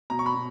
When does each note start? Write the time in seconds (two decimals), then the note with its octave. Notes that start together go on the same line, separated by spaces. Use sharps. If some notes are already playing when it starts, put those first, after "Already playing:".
0.10 B2 A#5
0.19 C#6
0.26 B5
0.35 B2